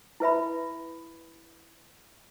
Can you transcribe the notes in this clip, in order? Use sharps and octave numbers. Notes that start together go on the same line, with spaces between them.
E4 B4 E5 B5